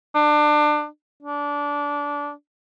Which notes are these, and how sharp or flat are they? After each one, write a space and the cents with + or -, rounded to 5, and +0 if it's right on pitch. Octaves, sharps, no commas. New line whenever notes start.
D4 +25
D4 -20